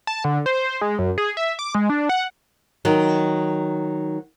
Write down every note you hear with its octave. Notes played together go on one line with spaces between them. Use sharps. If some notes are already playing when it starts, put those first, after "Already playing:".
A5
D3
C5
G#3
F#2
G#4
E5
D6
G#3
D4
F#5
D#3 F#3